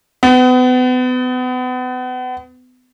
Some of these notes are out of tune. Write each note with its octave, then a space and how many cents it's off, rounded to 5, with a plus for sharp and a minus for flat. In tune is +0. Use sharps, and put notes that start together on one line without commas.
B3 +35